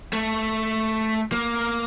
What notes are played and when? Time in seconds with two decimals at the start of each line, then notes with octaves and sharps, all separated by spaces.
0.13 A3
1.32 A#3